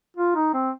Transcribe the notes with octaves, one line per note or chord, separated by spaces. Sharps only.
F4
D#4
C4